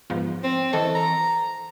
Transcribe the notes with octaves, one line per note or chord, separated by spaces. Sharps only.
G#2 F3 B3
C4
E3 A4 D#5 C#6
A#5